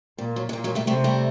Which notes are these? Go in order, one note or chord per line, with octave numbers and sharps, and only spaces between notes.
A#2 G3
F#3
G#3
A#2 G3
F#3 G#3
G3 A3
C3 G3 A3
G3 A3